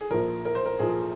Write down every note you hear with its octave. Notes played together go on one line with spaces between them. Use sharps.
G#4
A#1 A#2 F3 A#4
A#4
C5
A#4
A#1 A#2 F3 G#4